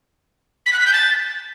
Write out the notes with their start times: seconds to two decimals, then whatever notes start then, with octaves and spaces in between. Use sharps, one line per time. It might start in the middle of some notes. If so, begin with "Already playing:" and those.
0.65 B6
0.72 F#6
0.79 B6
0.86 G6
0.93 A6